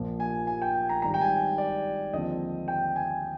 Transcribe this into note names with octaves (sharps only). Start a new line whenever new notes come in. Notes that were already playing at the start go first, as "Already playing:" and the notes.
Already playing: A#1 A#2 F3 A#3
G#5
G#5
G5
G#5
A#5
G#1 G#2 G3 A#5
G5
G#5
D5
D#2 D3 F3 G#3 C4 D#5
G5
G#5